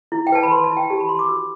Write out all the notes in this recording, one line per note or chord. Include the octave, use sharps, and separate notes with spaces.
E4
G5
B4 A5
B5
B4 C6
A5
E4
G5
G4 A5
B5
G4 C6
D6
F#4 E6